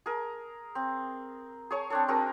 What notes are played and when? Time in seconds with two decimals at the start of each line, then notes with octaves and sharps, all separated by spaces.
0.06 G#4 A#4
0.75 C4
1.71 G#4 C#5 C#6
1.90 C4 D4 A4
2.08 C4 F#4 G#4 A#4